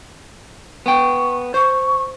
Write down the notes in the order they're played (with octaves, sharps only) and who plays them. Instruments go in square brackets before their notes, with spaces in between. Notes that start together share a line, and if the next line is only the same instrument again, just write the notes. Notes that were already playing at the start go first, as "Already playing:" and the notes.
[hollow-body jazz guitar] B3 G5 [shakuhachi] C#6
[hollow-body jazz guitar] C5 [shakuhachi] C#6